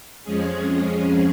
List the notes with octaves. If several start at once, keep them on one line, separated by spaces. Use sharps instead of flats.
F2 F3 G#3 C#4 G#4